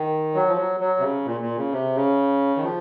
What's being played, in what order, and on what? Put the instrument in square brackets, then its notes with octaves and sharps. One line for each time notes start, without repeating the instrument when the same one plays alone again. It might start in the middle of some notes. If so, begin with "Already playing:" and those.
Already playing: [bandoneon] D#3
F#3
F3
F#3
F#3
C3
C#3
A#2
A#2
C#3
C3
C#3
D#3
F3